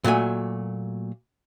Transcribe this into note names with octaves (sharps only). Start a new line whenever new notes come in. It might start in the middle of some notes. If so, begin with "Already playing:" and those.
A#2 F#3 A3 G#5